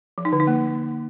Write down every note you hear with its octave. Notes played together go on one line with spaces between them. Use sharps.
F3
D#4
D3
D#4
A#3